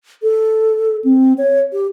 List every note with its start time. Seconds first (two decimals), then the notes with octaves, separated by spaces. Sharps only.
0.23 A4
1.04 C4
1.38 C#5
1.73 G4